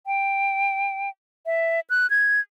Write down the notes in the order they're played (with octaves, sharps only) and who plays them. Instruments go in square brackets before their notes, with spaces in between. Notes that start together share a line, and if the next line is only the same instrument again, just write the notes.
[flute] G5
E5
F#6
G#6